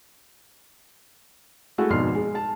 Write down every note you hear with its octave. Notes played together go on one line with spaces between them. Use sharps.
G#3 A3 E4 F#4 A4
G#1 F2 B2 C6 F6 C7
G#3
A5